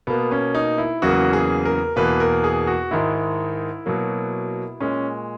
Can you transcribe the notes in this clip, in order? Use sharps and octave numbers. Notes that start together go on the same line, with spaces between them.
B2 A#3 B3
C#4
D#4
E4
E2 C#3 F#3 A#3 F#4
G#4
A#4
E2 B2 A#3 B4
A#4
G#4
F#4
G#2 D#3 G#3 E4
B2 F#3 A#3
A#2 G#3 C#4